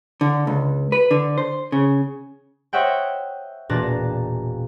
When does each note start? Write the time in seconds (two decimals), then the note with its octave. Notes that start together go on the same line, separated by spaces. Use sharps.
0.21 D3
0.47 C#2
0.92 B4
1.11 D3
1.38 C5
1.72 C#3
2.73 C5 C#5 D#5 E5 F#5 G5
3.69 E1 A#2 D4 A5 A#5 F#6